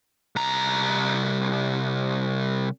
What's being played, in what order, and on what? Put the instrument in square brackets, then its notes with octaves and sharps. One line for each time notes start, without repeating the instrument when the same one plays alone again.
[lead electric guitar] C2 A#5